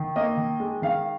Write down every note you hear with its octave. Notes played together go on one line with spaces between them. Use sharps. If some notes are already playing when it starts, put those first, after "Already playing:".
Already playing: D#3
A#3 D#5
D#3
G#3
D#3 F5